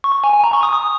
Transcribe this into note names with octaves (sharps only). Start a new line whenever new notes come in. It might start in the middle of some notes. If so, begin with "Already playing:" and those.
C#6
G#5
G#5
A#5
C#6
D#6
D#6